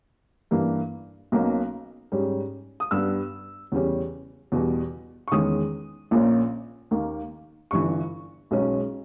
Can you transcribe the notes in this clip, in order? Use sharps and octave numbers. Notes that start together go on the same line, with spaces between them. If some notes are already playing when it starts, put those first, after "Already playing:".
G2 E3 A#3
B1 B2 A#3 C#4
G#2 G3 C#4
D#6
G2 G3 B3 E6
E2 C#3 G3 C#4
E2 B2 G3
C#6
E2 D#3 G#3 C#4 D#6
A#1 A#2 A#3 C#4
D#2 D#3 A#3
G1 G2 E3 C#6
B1 B2 G#3 C#4